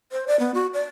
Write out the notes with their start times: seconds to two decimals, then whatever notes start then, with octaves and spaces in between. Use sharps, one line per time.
0.12 C5
0.27 D5
0.39 B3
0.54 F#4
0.74 D5